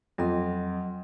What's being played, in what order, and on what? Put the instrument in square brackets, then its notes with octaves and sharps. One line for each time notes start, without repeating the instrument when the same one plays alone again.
[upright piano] F2 [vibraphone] F#3 D#5 C6